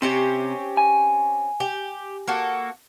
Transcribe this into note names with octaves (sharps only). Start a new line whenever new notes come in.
C3 C4 C#4 G4
G#5
G4
A#3 F#4 A4